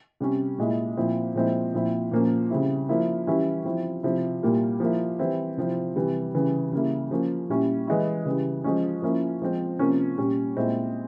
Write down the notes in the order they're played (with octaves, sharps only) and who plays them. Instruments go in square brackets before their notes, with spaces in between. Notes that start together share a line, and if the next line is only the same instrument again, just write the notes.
[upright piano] C3 G3 C#4
A#2 G#3 E4
A#2 F3 C4 E4
A#2 F3 G#3 C4 E4
A#2 F3 C4 E4
A#2 F3 A#3 C#4
C#3 G3 C4 E4
F3 A#3 E4
E3 G3 C#4 E4
F3 C4 E4
C3 F3 C4 E4
A#2 G3 A#3 E4
F3 A#3 E4
E3 G3 C4 E4
C3 F3 C4 E4
C3 E3 G3
C#3 E3 G3
C#3 G3 A#3 E4
F3 A#3 C#4
A#2 G3 C#4 E4
E3 G#3 E4
C#3 E3 G3
F3 G#3 C#4
F3 A#3 C#4 E4
F3 G#3 C4
C3 F3 A#3 C#4
A#2 G3 C#4
A#2 G#3 C4 E4